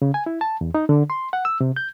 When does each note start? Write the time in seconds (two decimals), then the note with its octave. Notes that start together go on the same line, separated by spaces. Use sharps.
0.02 C#3
0.14 G#5
0.26 E4
0.41 A5
0.61 E2
0.75 D#4
0.89 D3
1.10 C6
1.33 F#5
1.45 E6
1.61 C3
1.76 G6